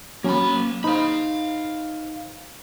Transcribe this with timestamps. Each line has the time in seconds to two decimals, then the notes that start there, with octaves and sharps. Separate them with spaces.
0.24 F#3 A#3 C#4 B5
0.84 D#4 C5 D#5 F5 B5